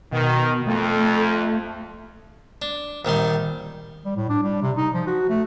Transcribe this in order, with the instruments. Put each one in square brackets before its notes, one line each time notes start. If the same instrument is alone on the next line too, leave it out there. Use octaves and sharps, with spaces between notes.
[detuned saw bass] B2 [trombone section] D#3
[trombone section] F2 [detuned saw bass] A3
[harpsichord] D4
A#1 D#3 G3 C6
[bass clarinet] G3
A2
D4
G3
C3
D#4
F3
F#4
A3